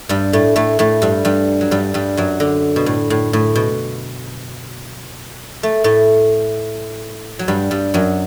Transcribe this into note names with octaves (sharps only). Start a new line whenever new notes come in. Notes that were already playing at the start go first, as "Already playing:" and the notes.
G2 G3
A2 A3
A2 A3
A2 A3
G2 G3
G2 G3
F#3
G2 G3
G2 G3
F#2 F#3
D3
B2
A2
A2
A2
B2
A3
A2 A3
F#3
G2 G3
G2 G3
F#2 F#3